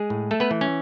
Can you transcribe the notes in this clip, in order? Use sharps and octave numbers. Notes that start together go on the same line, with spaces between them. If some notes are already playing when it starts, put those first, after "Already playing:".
Already playing: G#3 G#4
A2
A3 A4
B3 B4
E3
C#4